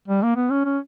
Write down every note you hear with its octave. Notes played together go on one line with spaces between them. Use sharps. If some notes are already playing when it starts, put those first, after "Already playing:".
G3
A#3
B3
C#4
C#4